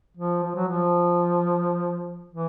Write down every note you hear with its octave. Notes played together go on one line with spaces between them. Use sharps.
F3
F3
F#3
F3
E3